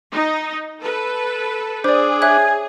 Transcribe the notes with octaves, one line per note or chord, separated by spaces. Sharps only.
D#4
A4 B4
D4 G#4 C5 D5
C#5 E5 G#5 F#6